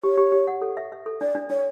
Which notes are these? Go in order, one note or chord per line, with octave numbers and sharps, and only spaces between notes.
G4 C#5
G4
G4
F#5
A4
E5
E5
A4
D4 D5
D4
D4 C#5